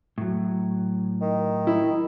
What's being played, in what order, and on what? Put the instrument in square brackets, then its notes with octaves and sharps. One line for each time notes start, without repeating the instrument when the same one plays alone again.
[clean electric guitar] A2 F#3
[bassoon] D#3
[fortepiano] E4